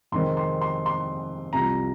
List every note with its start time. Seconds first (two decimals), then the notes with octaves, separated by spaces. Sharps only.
0.12 F2 C3 D#3 G#3 C4 C6
0.37 C6
0.62 C6
0.86 C6
1.53 C2 C3 F3 A#5